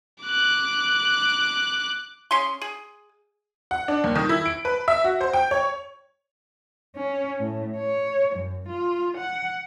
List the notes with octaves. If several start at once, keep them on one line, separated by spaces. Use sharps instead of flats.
D6 F#6
C#4 G#4 C6
G#4
F#5
D4
D#2
D#3
E4
D7
B4
E5
F#4
C5
G5
C#5
C#4
A2
C#5
F#2
F4
F#5